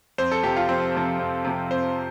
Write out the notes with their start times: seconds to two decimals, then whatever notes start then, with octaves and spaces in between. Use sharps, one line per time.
0.18 F2 C5
0.32 A4
0.43 C3 F3 G4
0.56 F4
0.69 F2 C4
0.95 C3 F3
1.19 F2
1.45 C3 F3
1.70 F2 C5